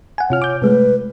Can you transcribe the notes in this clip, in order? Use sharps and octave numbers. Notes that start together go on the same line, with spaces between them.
F#5 G#5
C3 F4 C#5 F6
D6 G6
C3 G#3 A3 B4